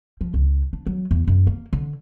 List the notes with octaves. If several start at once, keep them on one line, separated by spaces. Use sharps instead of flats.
F3
C#2
D4
F#3
E2
F#2
A#3
D3